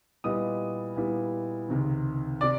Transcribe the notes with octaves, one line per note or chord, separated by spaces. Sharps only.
A#2 G3 B3 E4 D#5 D#6
A#2 G3 B3 E4
C#2 C3 D#3
C3 D5 D6